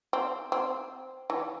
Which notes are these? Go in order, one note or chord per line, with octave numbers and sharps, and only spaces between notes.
C4
C4
E3